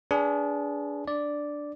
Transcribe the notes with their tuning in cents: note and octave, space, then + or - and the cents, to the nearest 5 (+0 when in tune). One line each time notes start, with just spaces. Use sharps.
D4 -25 G#4 +0 B4 +0
D4 +0 D5 -5